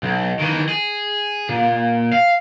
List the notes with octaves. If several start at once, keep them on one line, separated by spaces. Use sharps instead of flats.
B1
D#3 E3
G#4
A#2
F5